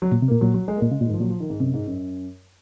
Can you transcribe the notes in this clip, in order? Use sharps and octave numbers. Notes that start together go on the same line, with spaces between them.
F#3
A#2
C3
A#2 A#3
A#2 F#3
F#3
G#3
A#3
A#2 G#3
C#3
A#2
D#3
G#2
F3
A#2 F#3
F3
D#3
G#2
F#2 C3
G#2
F#2